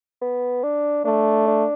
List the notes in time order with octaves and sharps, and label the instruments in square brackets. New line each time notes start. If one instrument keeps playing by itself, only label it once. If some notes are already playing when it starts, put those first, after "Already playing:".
[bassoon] B3
D4
[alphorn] A3 [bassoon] D4
[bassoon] D4